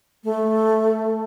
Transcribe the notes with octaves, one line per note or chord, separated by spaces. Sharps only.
A3